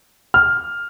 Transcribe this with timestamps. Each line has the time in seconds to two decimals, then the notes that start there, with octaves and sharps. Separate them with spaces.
0.34 F6